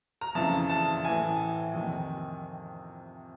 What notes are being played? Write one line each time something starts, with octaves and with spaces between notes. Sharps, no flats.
A#5
F2 C#3 E3 A5
A5
A2 E3 G#5
F2 C3 D#3